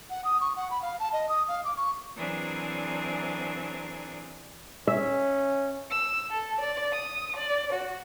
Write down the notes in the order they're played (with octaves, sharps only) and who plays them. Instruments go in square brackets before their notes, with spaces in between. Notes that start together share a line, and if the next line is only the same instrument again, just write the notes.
[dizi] F#5
D#6
C#6
F#5
B5
F5
A5
D#5
D#6
F5
D6
C#6
[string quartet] E3 F#3 C4 D4 G#4 A#4
[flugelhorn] C#4 [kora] E5
[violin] E6
A4
D5
D#6
D5
F#4